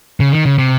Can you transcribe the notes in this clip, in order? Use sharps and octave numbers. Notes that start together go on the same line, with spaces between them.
C#3
D#3
C#3
C3